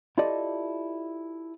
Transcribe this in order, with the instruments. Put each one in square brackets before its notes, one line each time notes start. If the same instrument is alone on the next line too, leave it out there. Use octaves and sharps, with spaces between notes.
[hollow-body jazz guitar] E4 F4 G4 A4 D5 D#5